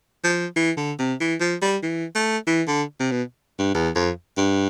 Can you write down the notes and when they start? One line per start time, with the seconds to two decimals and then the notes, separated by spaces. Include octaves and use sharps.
0.24 F3
0.56 E3
0.77 D3
0.99 C3
1.20 E3
1.40 F3
1.62 G3
1.83 E3
2.15 A3
2.47 E3
2.68 D3
3.00 C3
3.11 B2
3.59 G2
3.74 E2
3.95 F2
4.37 G2